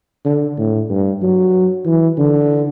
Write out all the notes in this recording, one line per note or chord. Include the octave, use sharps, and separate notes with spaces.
D3
A2
G2
F#3
E3
D3